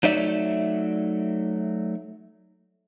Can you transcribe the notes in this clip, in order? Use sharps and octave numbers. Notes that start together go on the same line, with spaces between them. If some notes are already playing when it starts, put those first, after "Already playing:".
F#3 A3 D#4 C#5 D5 E5